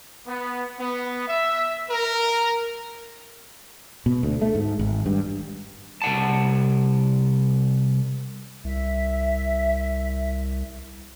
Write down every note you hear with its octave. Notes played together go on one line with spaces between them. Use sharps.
B3
B3
E5
A#4
B2
D2
A3
G#2
G#1
G2
C2 F#5 A5
C2 E5